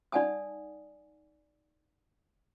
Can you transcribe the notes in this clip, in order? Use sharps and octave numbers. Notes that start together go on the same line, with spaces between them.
D#4 D5 F#5 G#5 A5 D#6